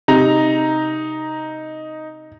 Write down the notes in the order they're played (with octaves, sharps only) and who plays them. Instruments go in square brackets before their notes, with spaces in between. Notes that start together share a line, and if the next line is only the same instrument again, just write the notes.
[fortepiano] C3 [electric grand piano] D#4 A#5